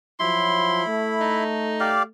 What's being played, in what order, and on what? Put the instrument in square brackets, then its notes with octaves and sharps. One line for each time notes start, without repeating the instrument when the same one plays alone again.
[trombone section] F3 F#3 [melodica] E4 B5 [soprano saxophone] C6
[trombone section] A3
[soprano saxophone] D#4
[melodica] G4 D5 F5